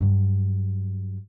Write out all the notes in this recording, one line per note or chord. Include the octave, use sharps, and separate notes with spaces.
G2 F#3